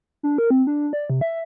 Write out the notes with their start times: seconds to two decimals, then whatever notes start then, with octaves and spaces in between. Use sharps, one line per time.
0.23 D4
0.38 A#4
0.50 C4
0.67 D4
0.93 D5
1.10 C3
1.21 E5